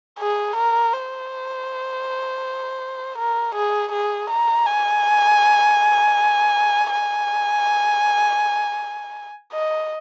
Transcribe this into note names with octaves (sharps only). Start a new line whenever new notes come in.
G#4
A#4
C5
A#4
G#4
G#4
A#5
G#5
G#5
D#5